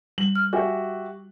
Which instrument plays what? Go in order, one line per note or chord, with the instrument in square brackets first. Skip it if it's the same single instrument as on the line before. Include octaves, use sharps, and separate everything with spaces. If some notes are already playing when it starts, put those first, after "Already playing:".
[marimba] G3 [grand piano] F#7
[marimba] F6
[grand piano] F#4 G4 E5 [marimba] G#5